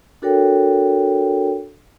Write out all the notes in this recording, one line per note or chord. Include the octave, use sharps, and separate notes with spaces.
D4 F#4 A4 A#4 C#5 G5